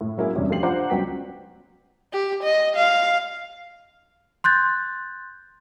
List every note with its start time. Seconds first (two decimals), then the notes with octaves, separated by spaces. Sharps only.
0.01 A2
0.18 F#3 G#3 A#3 C#4 E4 G#4
0.35 E2 G2 C3 G3 C#4
0.50 F3 A3 F4 G4 C7 F#7
0.63 D4 F4 C5 F#5 A#5 D6
0.90 C#2 F#3 G3 B3 G5 B6
2.13 G4
2.43 D#5
2.76 F5
4.44 C6 F#6 G6 A6